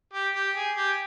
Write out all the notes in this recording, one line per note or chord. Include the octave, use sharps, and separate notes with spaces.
G4
G4
G#4
G4